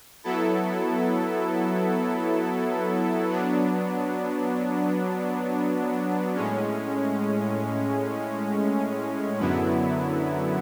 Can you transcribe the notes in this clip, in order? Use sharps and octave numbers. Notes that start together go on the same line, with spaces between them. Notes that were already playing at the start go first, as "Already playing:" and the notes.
F#3 B3 E4 A4
F#3 B3 D4
A2 G#3 C#4
F#2 D3 F#3 B3 E4